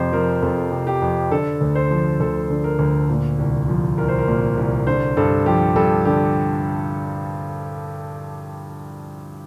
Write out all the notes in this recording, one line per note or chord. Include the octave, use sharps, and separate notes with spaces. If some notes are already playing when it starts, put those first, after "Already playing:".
Already playing: F2 C3 C5
F3 A#4
F2 A4
C3
G4
F2
D3 A4
D2
C5
F3
D2 A4
D3
A#4
D2
A#2
C2
F3
C2 A#4
C5
A#4
A#2
C2
D3 C5
G2 A4
F3 G4
G2 A4
D3 G4